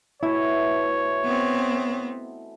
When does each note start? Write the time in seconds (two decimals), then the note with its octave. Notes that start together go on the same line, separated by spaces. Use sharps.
0.23 B2 E3 A3 E4 C#5
1.25 B3 C4